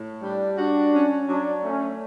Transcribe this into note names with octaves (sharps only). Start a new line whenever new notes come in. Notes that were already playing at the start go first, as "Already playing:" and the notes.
Already playing: A2
G3 D4
D4 F#4
C#4
F#3 D4
A3 C#4